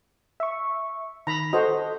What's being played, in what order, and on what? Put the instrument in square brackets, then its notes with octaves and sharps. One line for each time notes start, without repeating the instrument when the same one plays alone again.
[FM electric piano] E5 C#6
[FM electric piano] D#3 [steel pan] A#5 B5
[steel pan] F#4 C5 [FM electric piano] A4 D#5